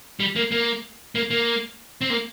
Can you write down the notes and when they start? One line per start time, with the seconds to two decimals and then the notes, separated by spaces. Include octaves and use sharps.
0.20 G3
0.36 A#3
0.51 A#3
1.15 A#3
1.30 A#3
2.01 C4
2.10 A#3